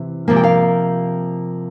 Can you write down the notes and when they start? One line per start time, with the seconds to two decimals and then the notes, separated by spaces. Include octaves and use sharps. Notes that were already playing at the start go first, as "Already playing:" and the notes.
Already playing: C3 E3
0.28 C3 F3 A#3 F5
0.36 G5
0.43 F5